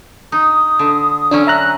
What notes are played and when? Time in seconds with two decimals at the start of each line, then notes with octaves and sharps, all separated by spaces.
0.32 D#4 D#6
0.79 D3
1.31 D3 F#3 C#4 D4
1.47 E5 A#5 F#6